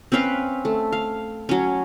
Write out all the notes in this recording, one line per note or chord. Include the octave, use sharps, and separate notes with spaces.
C4 C#4 B4 F5
A3
F5
F#3 C#4